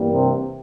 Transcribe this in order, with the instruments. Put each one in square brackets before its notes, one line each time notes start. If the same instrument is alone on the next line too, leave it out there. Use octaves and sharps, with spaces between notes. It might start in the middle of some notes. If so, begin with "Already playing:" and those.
Already playing: [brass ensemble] G2 E3 G3 A#3
[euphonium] C3